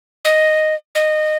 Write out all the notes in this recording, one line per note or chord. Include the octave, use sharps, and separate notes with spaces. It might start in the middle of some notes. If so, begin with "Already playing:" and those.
D#5
D#5